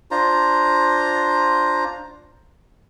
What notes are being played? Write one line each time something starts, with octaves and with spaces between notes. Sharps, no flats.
D4 F4 C5 A#5